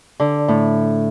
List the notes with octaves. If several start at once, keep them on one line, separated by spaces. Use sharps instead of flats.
D3
A2